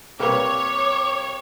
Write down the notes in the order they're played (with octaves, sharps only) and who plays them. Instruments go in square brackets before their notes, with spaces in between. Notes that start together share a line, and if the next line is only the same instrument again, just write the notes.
[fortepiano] C2 A#3 B4 [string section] C#5 [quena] D6